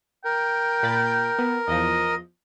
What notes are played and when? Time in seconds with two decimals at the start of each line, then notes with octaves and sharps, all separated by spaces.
0.25 A#4 G5
0.83 A#2 B5 A6
1.39 B3
1.68 E2 F3 D#5